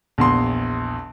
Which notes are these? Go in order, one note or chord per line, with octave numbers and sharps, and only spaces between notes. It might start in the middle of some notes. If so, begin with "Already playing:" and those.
A#1 E2 C6